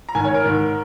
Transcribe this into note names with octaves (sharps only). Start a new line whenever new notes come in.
A#5
G#2 D#3 G#5
C#5
A#4
G#2 D#3